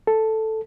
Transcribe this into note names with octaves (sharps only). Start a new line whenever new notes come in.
A4